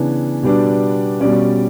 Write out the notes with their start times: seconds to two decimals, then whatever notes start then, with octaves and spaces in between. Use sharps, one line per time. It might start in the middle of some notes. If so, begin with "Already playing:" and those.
Already playing: C#3 E3 B3 D4
0.43 B2 G3 B3 D4
1.20 B2 G3 C#4 D5